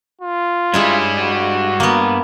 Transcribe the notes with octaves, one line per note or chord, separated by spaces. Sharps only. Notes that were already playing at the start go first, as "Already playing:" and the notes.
F4
G2 G3 G#3 E4 C#5
F#4
A#3 B3